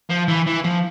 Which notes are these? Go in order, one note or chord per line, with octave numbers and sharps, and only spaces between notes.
F3
E3
E3
F3